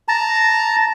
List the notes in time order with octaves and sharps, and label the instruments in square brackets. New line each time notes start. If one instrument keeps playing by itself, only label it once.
[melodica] A5 A#5